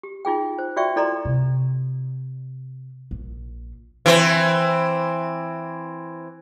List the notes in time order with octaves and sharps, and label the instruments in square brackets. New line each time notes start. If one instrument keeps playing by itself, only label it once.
[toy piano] G4
D#4 F4 G#4 G5
C5
F4 F#4 D5 E5 G5 C#6
E4 A4 D5 D#5 A#5 C6
[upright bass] C3
A#1
[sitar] E3 C4